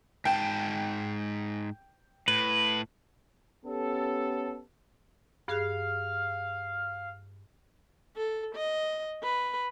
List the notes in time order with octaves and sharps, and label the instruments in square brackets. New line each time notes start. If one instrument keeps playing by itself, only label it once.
[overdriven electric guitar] G#2 A5 [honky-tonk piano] G5
[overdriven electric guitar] A2 [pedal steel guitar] B4
[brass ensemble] B3 C#4 G4 A4
[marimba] G2 G#4 F#6 [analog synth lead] F5
[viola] A4
D#5
B4